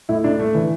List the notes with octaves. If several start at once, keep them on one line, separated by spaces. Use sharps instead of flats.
A2 E4
A2 D4
A3
E3